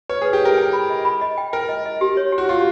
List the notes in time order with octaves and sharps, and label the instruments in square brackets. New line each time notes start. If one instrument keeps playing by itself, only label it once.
[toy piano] B4 [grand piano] C#5
[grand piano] G#4
[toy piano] B4
[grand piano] G4
[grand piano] A#4 [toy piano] D#5
[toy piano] G5
B5
D#5
B5
D#5
G5
[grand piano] A#4 [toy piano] G5
[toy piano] D#5
D#5
G4
C#5
G4
[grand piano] F#4
[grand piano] F4 [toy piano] G4